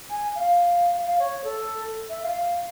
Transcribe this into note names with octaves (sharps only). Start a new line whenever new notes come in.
G#5
F5
F5
C#5
A4
E5
F5